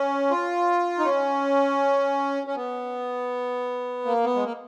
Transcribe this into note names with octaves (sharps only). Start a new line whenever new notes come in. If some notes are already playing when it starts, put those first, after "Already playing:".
Already playing: C#4
F4
D#4
C#4
C#4
B3
A#3
B3
G#3
A#3